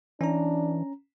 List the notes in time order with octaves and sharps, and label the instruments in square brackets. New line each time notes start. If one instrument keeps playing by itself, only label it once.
[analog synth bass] E3 [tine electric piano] C#4 A#5 [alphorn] D4